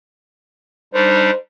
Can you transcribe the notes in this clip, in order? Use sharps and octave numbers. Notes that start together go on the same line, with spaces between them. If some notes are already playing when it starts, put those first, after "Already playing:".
G3 D4 D#4 C5